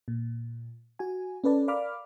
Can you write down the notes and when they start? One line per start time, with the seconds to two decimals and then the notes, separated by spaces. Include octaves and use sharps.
0.08 A#2
0.99 F#4 G#5
1.44 C#4 A4 B4 D5 A5
1.68 A#4 D5 F5 B5 D6 F6